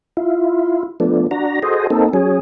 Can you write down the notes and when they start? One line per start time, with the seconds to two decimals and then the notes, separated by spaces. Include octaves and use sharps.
0.17 E4 F4
1.00 F3 A3 B3 D4
1.31 D4 F#4 A#5
1.62 F#4 G#4 A4 C5 D#5
1.90 A#3 C4 D#4 A4
2.13 F#3 C#4 G#4